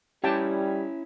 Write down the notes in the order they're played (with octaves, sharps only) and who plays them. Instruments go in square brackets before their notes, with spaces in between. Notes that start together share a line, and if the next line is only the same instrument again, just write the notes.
[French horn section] G3 [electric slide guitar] C#4 E4 [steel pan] G4 G5 A5